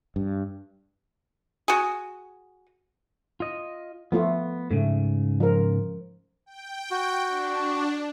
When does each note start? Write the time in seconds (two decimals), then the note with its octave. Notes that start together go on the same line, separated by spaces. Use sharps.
0.16 G2
1.68 F#4 G#4
3.40 F4 D#5
4.12 F3 A3 B3 F4
4.71 G#2 C#3 A3
5.40 F3 A#4
6.46 G5
6.91 F#4
7.27 D4